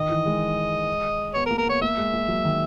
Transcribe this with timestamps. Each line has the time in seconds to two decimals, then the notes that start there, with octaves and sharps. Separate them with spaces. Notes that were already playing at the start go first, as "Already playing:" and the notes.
Already playing: D#3 D#5
0.10 E3
0.26 G#3
1.34 B3 C#5
1.46 A#4
1.51 A#3
1.58 A#4
1.66 B3 C#5
1.82 A#3 E5
1.98 G#3
2.13 A#3
2.28 F#3
2.45 D#3